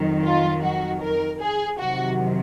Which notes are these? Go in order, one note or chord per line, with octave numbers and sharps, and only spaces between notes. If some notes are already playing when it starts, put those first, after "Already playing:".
Already playing: F2 D#3 F#3
F4
F#4
A#4
G#4
F2 C3 D#3 F#3 F#4